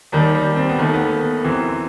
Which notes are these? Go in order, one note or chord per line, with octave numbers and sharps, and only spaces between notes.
D#2 D#3 G3
G3
C4
B3
D#2 D#3 A3
B3
F#2 E3 C4